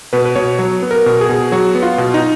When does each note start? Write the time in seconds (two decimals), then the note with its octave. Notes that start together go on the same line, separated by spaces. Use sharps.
0.13 B2 B4
0.26 B4
0.35 B2 C#5
0.59 F#3
0.82 B3
0.91 A#4
1.06 B2
1.21 G#4
1.29 B2
1.52 F#3 F#4
1.75 B3
1.82 F4
1.98 B2
2.14 D#4